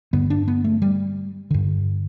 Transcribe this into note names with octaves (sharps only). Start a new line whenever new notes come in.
G2 D3 B3
D4
B3
A3
G3
G2 D3